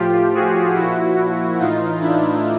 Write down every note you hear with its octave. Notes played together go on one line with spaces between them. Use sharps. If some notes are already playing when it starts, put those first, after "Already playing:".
Already playing: A2 F3 F4 G4
F#4 G#4
A#2 F3 E4 F#4
A2 E3 D#4 F4
D4 E4